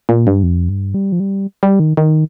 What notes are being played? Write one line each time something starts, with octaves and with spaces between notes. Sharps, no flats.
A#2
G2
F2
G2
G3
F3
G3
G3
D#3
D#3